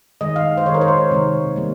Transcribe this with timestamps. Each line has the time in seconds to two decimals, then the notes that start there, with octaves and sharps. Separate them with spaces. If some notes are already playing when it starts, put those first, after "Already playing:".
0.21 D#3 G#3 D#5
0.36 F5
0.57 C5
0.66 D#3 G#3 C#5
0.74 A#4
0.81 C5
0.88 C#5
1.11 C3 D#3 G#3
1.56 G3 A#3